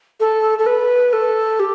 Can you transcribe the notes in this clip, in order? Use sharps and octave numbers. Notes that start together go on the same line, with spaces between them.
A4
A4
B4
A4
G4